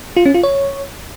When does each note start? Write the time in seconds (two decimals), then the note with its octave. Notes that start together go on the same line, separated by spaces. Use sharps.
0.16 F4
0.25 C#4
0.34 F4
0.43 C#5